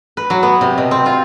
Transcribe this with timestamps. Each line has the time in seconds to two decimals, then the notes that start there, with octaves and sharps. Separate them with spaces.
0.17 B4
0.30 F#3
0.43 B3
0.61 C3
0.78 B2
0.91 C4
1.06 F4